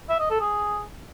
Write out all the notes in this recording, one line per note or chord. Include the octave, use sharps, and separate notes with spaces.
E5
D#5
A4
G#4